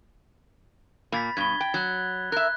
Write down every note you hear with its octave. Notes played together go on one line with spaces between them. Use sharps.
A#2 A#3 B5 A6 B6
G2 B2 G#6 G7
G5
F#3 F#6 G#6
A#4 E5 F#6